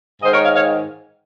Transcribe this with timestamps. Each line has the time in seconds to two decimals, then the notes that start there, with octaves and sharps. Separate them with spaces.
0.22 G#2 D#3 G#3 C5 D#5
0.33 A#4 C#5
0.43 C#5 F5
0.54 C#5 F5